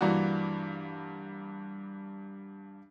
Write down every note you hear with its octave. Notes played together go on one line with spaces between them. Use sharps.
G2 E3 A#3 D4 F#4